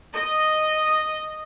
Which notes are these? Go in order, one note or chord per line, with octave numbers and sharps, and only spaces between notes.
D#5